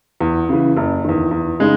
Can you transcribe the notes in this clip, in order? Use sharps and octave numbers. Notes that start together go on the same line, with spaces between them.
E2
C#3 E3
F#1
E2 D#3
E2
C#3 G#3 D#4